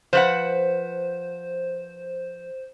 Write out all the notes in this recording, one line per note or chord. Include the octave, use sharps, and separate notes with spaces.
F3 B4 C5 F#5